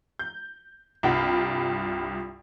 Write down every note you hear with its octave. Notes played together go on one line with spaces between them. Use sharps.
G6
C2 G2 F4 G5 B5